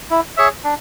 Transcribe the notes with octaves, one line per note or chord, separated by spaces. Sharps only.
E4
G#4 C#5 E5
D4